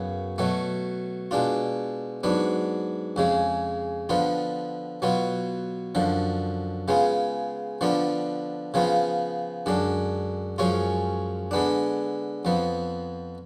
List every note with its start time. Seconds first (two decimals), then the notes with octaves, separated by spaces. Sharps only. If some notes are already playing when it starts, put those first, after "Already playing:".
Already playing: F#2 C#3 F#3 B3
0.38 B2 F#3 A3
1.31 B2 G#3 D4 F4
2.23 G#2 F#3 B3 D4
3.16 F2 C#3 G#3
4.09 D3 F3 B3 F4
5.02 B2 F#3 B3 F4
5.95 F#2 D3 F3
6.88 C#3 G#3 B3 F4
7.81 D3 F3 B3 D4 F4
8.74 C#3 F3 B3 F4
9.66 F#2 D3 G#3 D4
10.58 F#2 F3 G#3 C#4 F4
11.51 D3 G#3 B3 D4
12.45 F2 F3 B3